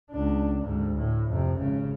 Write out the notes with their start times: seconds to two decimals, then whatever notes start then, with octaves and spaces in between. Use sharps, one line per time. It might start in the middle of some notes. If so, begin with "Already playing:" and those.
0.11 C#2 D4
0.63 D2 G#2
0.98 A2
1.29 F2 C3
1.59 G#1 C#3